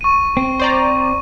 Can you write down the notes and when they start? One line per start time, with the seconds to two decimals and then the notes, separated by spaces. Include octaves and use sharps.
0.01 C#6 D#7
0.37 C4
0.59 C5 D5 A#5